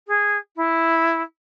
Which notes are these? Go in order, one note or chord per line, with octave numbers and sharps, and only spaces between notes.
G#4
E4